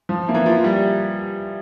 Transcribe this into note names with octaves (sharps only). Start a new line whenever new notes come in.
F3
A#3 E4
E3
F3 A#3
F3
G3 E4 G4